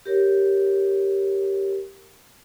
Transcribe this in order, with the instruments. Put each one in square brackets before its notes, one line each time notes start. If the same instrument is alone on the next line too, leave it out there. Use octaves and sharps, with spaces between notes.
[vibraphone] G4 A#4 C#5